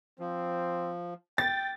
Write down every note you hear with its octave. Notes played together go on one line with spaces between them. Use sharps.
F3 C4
G5 A6